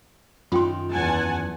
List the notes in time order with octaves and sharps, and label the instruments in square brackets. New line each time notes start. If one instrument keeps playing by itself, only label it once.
[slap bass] F#2 D#3 [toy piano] F4 G5 C6
[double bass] E2 [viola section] F#5 G#5 A5